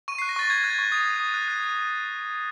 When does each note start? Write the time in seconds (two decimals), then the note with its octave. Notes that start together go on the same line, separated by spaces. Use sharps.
0.08 C#6 D#7
0.18 F#6 C7
0.29 A#6
0.36 C#6 A6
0.50 C#6 G#6
0.64 F#6
0.70 G#6
0.78 C#6
0.92 D#6 G#6
1.06 F#6
1.20 D#6
1.34 F#6
1.48 F#6